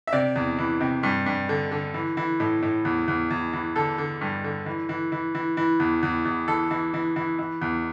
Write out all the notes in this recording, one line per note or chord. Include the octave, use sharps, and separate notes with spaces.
E5
C3 D5
E2
E3
C3
G2
G2
D3
D3
E3
E3
A2
A2
E2
E2
E2
E3
D3 A4
D3
G2
D3
E3
E3
E3
E3
E3
E2
E2
E2
E3 A4
E3
E3
E3
E3
E2